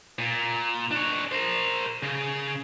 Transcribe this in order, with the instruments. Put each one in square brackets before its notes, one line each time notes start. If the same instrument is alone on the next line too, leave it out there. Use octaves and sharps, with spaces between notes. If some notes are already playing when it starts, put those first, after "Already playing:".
[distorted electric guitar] A#2
D4 C#5
A#4 C5
C#3